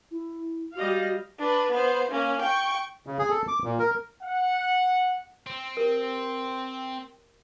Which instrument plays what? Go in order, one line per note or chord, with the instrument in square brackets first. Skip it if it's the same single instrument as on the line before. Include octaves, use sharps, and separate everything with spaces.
[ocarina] E4
[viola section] G3 D#5 F5 [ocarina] F#4
[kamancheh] D4 B4
B3 C5
A#3 C#4
G5 C#6
[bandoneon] C#3
G#4
A4
D6
A#2
A#4
[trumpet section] F#5
[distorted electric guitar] C4
[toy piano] G4 A#4